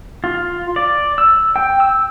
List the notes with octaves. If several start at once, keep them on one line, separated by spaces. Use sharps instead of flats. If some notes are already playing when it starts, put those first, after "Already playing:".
F4
D5
E6
G5
E6